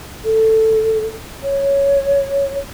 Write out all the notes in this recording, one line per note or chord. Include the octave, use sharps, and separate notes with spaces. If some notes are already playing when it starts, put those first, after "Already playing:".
A4
C#5